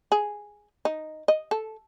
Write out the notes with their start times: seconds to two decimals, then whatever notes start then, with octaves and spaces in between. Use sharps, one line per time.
0.12 G#4
0.85 D#4
1.28 D#5
1.51 A4